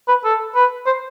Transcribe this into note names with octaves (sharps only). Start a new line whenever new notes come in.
B4
A4
B4
C5